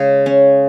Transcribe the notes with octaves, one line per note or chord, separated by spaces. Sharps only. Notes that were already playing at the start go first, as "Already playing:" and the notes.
Already playing: C#3 G#3
C#4